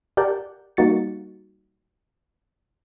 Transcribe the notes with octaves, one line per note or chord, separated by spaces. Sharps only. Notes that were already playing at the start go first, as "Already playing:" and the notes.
G4 A#4 D5 F#5 A5 G6
G3 A#3 D#4 F#4 A6 C#7